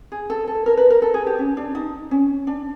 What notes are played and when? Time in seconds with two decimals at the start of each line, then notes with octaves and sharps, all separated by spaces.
0.12 G#4
0.30 A4
0.48 A4
0.66 A#4
0.77 B4
0.90 A#4
1.02 A4
1.14 G#4
1.27 G4
1.39 C#4
1.57 D4
1.75 D#4
2.11 C#4
2.47 D4